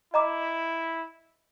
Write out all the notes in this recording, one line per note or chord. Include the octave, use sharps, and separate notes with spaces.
E4 D#5 A#5 D6